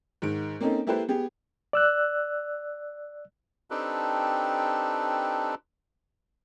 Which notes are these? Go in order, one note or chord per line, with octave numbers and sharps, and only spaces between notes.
G#2 D#3 D7
A#3 C4 C#4 D#4 A4
A#3 E4 G4 A4 B4 C5
B3 G4 G#4
D5 E6 F#6
C4 D4 D#4 G4 A4 B4